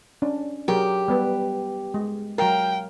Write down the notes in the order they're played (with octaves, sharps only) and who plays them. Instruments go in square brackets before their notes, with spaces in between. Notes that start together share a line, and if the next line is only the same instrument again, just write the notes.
[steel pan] C#4 D4
[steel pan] F#3 G#4 A#4 [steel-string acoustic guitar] G4
[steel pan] G3 B3 B4
G#3
[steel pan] F#3 A#4 [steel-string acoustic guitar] F5 [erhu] G5